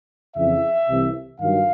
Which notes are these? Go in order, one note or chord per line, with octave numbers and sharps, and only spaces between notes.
F2 C#3 E3 E5
C2 C3 E3
G2 D#3 F#3 F5